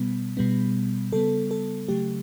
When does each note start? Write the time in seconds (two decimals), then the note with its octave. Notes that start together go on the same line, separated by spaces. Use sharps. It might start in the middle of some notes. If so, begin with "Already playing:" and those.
Already playing: B2 G3 B3
0.37 B2 G3 B3
1.12 C#3 G3 B3 A4
1.51 A4
1.88 C#3 F#3 A3 G4